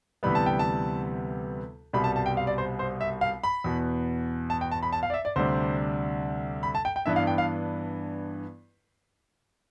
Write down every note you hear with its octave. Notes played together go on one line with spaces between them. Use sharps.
D2 C3 E3 G3 B3 B5
A5
G5
A5
C2 B2 G3 B5
A5
A5
G5
F5
D5
C5
C5
E5
F5
B5
E2 B2 B3
A5
G5
A5
B5
A5
F5
D5
E5
D5
D2 C3 G3 D4 C5
B5
A5
G5
G5
G2 E3 B3 D4 E5
F5
G5
F5